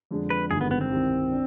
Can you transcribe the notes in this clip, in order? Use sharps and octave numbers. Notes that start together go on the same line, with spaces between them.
F2 D3 G#3 D4
B4
G1 G2 D#3 G#3 G#4
B3
B3
C4
C2 C3 D#3
D4